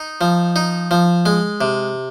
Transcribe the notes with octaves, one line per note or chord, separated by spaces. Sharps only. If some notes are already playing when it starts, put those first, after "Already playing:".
Already playing: D#4
F3
D#4
F3
G#3
C3